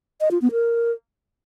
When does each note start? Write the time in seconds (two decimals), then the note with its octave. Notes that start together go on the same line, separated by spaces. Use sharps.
0.21 D#5
0.31 F4
0.42 B3
0.52 A#4